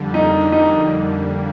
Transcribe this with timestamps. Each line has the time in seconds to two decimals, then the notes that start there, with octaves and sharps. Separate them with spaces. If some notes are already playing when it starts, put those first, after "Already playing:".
Already playing: F2 D3 G3
0.14 A#3 D#4
0.40 G3
0.52 D#4
0.66 D3